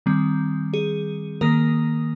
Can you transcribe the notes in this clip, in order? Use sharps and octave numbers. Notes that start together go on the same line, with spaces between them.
D#3 G3 C4
G#4
D#3 A#3 A#4